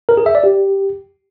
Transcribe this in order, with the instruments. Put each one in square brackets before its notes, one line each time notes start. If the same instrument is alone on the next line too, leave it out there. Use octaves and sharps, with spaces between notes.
[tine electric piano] A#4
G#4
E5
D5
G4